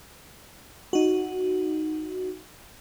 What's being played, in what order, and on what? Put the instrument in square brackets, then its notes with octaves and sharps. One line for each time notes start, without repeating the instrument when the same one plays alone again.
[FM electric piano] D#4 F#4